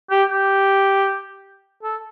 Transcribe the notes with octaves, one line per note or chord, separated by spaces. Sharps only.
G4
G4
A4